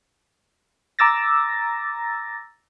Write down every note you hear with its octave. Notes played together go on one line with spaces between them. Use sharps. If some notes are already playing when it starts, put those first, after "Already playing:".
A#5 D6 E6 A6 A#6